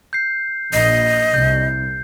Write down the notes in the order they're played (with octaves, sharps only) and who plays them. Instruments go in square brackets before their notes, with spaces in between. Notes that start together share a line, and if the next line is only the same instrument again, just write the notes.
[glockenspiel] G6 C7
[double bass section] A#1 [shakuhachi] D#5 [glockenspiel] C7
[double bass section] C2 [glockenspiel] G6